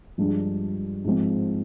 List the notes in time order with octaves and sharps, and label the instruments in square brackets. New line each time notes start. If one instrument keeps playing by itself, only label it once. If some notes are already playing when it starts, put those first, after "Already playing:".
[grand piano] G2 F3 G#3 D4
G#2 F3 C4